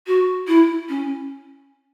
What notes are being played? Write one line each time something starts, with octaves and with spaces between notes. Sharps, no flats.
F#4
E4
C#4